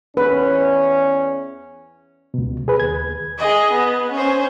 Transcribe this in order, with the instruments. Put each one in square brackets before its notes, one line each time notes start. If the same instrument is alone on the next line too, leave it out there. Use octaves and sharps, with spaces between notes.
[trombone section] E2 C#4 [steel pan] B4
[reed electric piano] C#2 B2
G#4 B4
D#2 G#6
[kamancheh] G#4 D#5
B3
C#4 C5